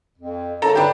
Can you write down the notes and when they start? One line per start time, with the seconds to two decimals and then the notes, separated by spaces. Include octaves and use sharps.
0.19 F2
0.62 F#2 C#3 A4 C#5 A#5
0.75 G2 D3 D4 G4 B4